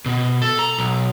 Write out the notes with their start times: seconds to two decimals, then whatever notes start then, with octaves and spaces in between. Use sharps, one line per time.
0.06 B2
0.42 A4
0.59 A#5
0.78 B1